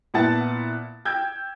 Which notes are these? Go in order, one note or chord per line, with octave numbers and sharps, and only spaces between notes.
A#2 B3 E4 F#5 A5 A6
G5 E6 G6 G#6